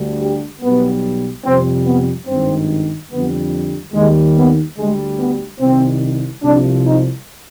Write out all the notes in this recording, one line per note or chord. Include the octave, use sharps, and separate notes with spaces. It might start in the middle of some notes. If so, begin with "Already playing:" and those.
Already playing: D2 D3 G3
G4
B1 B2 G3 B3
F2 C3 G3 C4
B3
G#1 G2 D#3 C4
F2 D3 G3 B3
D#2 D#3 G3 G#3
B3
D2 D3 G3 G#3
B3
C2 C3 D#3 C4
C2 C3 F3 D4
D#4